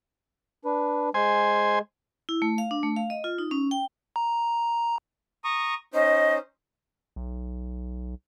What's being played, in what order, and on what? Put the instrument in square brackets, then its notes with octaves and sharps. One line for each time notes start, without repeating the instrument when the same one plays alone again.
[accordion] D4 B4
[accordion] G#3 [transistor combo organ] C5 G#5
[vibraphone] E4
A3
F5
D4
A3
F5
D#5
F4
D#4
C#4
G5
[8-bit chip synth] A#5
[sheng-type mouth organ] A#5 C#6 D#6
[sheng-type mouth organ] C#4 D#4 C5 [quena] D#5
[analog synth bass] B1